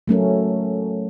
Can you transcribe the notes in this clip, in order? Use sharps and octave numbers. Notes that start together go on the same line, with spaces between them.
F#3 A3 C#4 A#4